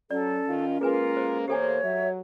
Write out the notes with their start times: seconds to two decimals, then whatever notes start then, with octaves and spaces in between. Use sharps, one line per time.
0.11 F#3 C#4 A4 D5
0.48 D#3 F4
0.81 G#3 A#3 F4 G#4 A#4 B4 G#5
1.17 C5
1.48 E2 A#3 G4 A4 C5 C#5 G#5
1.83 F#3 E5